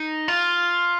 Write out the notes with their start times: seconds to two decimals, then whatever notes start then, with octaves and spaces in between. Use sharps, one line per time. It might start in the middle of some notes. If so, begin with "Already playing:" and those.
Already playing: D#4
0.28 F4